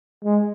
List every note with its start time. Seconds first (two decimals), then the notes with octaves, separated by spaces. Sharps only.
0.24 G#3